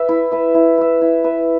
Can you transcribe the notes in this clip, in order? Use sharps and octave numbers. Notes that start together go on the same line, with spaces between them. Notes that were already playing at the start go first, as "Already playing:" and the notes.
Already playing: B4 E5
E4
B4 E5
E4
B4 E5
E4
B4 E5